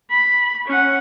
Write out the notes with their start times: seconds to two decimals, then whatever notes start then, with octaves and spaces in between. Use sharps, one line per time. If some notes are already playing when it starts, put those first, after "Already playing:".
0.11 B5
0.67 C#4 F#5